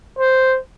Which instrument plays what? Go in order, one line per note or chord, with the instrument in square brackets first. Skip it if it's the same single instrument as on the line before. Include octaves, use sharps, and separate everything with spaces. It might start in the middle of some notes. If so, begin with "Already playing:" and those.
[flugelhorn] C5